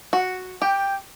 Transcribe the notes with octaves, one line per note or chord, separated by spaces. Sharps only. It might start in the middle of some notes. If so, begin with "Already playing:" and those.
F#4
G4 G5